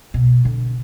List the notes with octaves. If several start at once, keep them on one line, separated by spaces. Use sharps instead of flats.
B2
D3